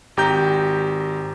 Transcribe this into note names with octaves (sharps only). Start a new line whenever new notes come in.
G#1 G4 A#5 G6